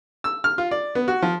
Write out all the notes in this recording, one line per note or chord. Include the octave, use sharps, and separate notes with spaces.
E6
F6
F4
D5
B3
F#4
F3